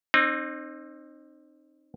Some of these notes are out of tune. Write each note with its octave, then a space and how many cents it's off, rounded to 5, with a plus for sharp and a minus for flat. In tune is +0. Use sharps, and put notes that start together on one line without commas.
C4 +25 D#4 -25